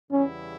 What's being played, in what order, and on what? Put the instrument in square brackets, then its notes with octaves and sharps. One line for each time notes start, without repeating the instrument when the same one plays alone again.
[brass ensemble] E2 C#3 G3 B3 E4 [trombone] C#4